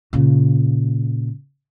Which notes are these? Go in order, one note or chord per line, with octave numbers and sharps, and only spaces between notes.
A#2 C#3